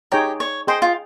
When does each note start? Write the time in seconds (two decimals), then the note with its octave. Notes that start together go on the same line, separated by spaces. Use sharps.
0.12 D#4 G4 G#4 C#5 G5 A#5
0.40 C#5
0.67 G#4 C5 D#5 G5 C6
0.82 F4